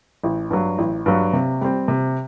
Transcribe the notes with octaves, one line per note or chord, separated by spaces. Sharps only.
A1
G2 F#3
A1
G2 F#3
C3
G3 C4
C3